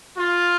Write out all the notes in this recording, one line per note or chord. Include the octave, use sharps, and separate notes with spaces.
F4